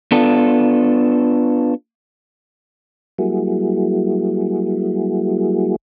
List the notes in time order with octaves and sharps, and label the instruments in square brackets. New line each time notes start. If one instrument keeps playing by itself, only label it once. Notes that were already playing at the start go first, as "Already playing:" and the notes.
[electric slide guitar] B3 D4 F4 A4
[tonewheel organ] F#3 G3 A#3 E4 F#4 G#4